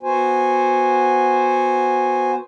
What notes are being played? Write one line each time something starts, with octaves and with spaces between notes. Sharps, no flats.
B3 F#4 C5 G#5